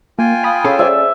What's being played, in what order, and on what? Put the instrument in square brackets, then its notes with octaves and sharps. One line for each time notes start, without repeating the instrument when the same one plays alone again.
[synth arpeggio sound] A#3 [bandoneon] F4 G5 G#5
[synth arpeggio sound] F5 B5 D#6
[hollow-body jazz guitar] C#4 G#4 A4
[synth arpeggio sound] C5 D5 [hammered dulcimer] E5